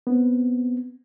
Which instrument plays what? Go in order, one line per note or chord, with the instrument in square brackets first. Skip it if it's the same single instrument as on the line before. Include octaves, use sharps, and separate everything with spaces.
[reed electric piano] B3 C4